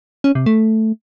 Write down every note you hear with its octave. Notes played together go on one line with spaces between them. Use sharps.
C#4
C3
A3